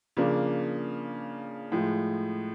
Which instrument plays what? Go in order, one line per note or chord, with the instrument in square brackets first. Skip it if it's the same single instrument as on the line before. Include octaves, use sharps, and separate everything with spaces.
[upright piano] C#3 F3 A#3 D4
A2 F3 G#3